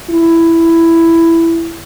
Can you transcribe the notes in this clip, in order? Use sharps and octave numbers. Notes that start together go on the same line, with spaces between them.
E4